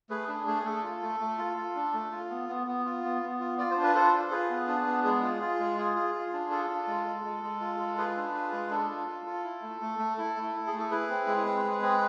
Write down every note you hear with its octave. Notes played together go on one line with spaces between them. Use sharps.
A3 G#4 B4
D4 G#4
A3 G#4
A3 A4
F4
A3
A3
F4
F4
D4
A3
F4
B3
B3
B3
F4
B3
B3
F4
F4 D5
C5
D4
B4
F4 A4 C5
F4
F4 G#4 B4
B3
D4
B3
G#3 G#4
F4
F4
G#3
F4
F4
F4
D4
F4 A4
F4
G#3
G#3
G#3
G#3
F4
G#3
F4 G#4 B4
D4
F4
G#3
D4 A4
F4
F4
F4
E4
A3
A3
A3
E4 A4
A3
E4
G#4
A3
A4
E4 G#4 B4
C4
G#3
C4
G#3
C4